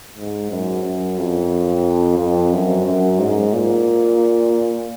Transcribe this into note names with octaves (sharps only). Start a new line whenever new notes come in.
G#2
F#2
F#2
F2
F2
F#2
F#2
G#2
A#2